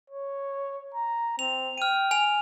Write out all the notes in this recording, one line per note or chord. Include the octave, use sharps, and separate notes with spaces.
C#5
A#5
C4 F7
G5 F6 D#7
G#5 F7